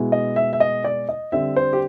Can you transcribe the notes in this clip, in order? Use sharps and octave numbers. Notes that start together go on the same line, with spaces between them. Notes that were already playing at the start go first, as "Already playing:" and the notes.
Already playing: B2 G#3 B3 E4
D#5
E5
E5
D#5
D5
D#5
D3 G3 C4 E5
C5
G4